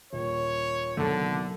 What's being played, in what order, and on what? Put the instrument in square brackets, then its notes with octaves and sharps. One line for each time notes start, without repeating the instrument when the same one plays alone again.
[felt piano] D#1 [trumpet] C#5
[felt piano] F#1 A4 [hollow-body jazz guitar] B2 D#3 A3 [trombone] D3